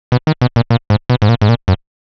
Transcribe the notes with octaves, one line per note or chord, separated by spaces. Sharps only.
B2
D#3
B2
A#2
A#2
G#2
B2
G#2
A#2
G#2
A#2
F#2